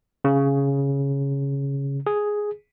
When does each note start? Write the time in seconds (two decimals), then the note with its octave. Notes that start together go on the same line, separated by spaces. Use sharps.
0.24 C#3
2.07 G#4